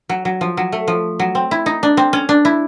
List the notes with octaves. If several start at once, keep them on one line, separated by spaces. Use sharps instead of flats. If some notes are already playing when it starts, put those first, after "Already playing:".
F#3
F#3
F3
F#3
A3
F3
F#3
C4
E4
D#4
D4
C4
C#4
D4
E4